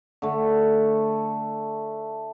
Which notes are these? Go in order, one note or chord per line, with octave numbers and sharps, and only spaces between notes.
D3 A3